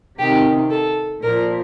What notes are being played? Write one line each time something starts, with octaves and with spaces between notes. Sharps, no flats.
C3 D#3 G4
A4
A#2 F3 A#4